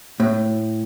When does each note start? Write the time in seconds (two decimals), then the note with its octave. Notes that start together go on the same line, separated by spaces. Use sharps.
0.20 A2